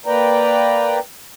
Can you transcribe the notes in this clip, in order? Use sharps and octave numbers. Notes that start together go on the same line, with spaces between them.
A#3 B4 D5 G5 A#5